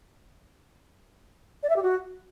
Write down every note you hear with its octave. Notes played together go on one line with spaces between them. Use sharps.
D5
E5
G4
F#4